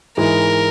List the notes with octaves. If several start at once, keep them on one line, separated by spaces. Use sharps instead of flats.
G#2 E3 G#3 A#4